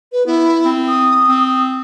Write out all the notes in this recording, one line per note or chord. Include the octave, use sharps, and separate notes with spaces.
B4
B3 E4
C4
D#6
C4